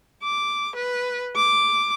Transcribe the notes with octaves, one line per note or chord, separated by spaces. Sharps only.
D6
B4
D6